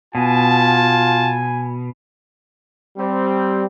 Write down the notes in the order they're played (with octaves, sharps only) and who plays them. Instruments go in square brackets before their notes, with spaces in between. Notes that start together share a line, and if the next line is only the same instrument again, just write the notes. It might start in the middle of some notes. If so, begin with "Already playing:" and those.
[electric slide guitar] B2 [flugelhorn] F4 [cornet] G#5 [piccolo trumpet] A5
[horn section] G3 C4